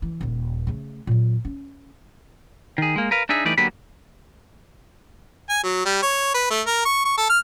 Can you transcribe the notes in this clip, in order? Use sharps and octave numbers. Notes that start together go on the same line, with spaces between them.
E3
D#1 D#2
C#3 A3
A#2 F#3
C#4
D#3 G#4
G#3 A#3
A#4 B4 F5
D4 D#4 G#4 E5
E3 G3 A3 D#4 B4 D5
D3 F#3 A#3 B3 G4 B5
G#5
F#3
G3
C#5
B4
A3
A#4
C#6
C#6
A4
F6